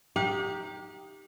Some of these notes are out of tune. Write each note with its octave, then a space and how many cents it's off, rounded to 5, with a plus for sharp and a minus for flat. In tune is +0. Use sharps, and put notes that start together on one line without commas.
D#4 +0 G4 +0 F#5 -45